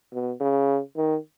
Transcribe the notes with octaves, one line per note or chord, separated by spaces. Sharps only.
B2
C#3
D#3